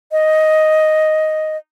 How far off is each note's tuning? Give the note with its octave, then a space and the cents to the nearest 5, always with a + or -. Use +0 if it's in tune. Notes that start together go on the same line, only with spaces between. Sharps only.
D#5 +5